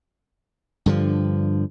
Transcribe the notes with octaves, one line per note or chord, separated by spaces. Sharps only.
G2 D3 F3